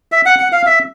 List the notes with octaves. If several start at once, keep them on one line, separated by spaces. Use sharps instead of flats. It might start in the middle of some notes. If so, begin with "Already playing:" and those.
E5
F#5
F#5
F5
E5